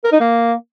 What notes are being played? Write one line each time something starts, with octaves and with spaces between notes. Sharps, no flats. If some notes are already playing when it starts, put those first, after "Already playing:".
A#4
D#4
A#3